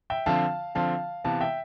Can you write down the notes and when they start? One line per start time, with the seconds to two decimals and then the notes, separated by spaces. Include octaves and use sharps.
0.10 E5 G5
0.26 D3 F3 C4 F4 F5 A5
0.75 D3 F3 C4 F4 F5 A5
1.24 C3 E3 B3 F5 A5
1.41 E5 G5